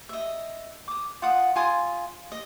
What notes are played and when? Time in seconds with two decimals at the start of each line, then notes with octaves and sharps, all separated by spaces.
0.09 D#5 E5
0.88 D6 D#6
1.22 F4 F#5 D#6
1.56 F4 G#5 C6 D#6
2.32 D#5